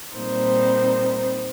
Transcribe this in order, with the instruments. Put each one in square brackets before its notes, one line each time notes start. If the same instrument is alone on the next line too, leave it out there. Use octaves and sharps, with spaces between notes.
[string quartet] A#2 G3 C4 D#4 C5